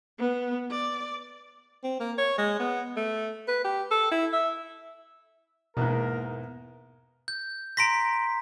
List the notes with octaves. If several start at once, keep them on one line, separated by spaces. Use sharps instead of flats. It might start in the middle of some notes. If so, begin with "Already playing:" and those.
B3
D5
C4
A#3
C#5
G#3
B3
A3
B4
G4
A4
E4
E5
E2 G#2 B2 A#3 A#4
G6
A#5 C6 A#6 B6 D7